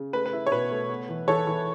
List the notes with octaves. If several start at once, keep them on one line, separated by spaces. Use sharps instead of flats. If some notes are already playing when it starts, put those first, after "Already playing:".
Already playing: C#3
A3 B4
B4
E4
C#5
B2 B4
A3
B3
E3
E3 A4 C#5
E3